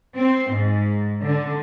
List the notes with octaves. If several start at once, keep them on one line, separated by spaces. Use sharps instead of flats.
C4
G#2
D3